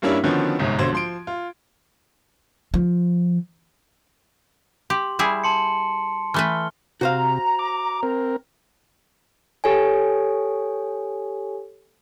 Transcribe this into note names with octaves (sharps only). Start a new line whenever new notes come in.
G2 G3 A#3 C#4 D4 E4
D3 D#3 F3 B3 C#4 F#4
G1 C2 G#2
B1 D3 C5 G#6
F3 C6 D7
F4
F3
G4 C6
G3 E4 G#4
A5 C6 C#7
E3 A3 B4 F6 G7
C3 F#4 C5 F5 A#5
D6
C4 A#4
G4 A4 C#5 G#5